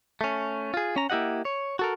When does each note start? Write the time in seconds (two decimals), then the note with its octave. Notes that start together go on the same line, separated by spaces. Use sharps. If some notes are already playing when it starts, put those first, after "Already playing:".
0.21 A3 C#4
0.74 F4 G#4
0.96 C#4 A#5
1.10 A#3 E4 G4 D#5 F#5
1.45 C#5
1.79 F#4 A4 A#4